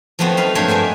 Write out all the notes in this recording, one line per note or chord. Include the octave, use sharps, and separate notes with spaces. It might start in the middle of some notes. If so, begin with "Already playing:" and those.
F3 F#3 A3 B3 C4 F#4
D#4 B4 F5
G2 A3 A#3 C5 C#5 G5
B4 D5 E5 G#5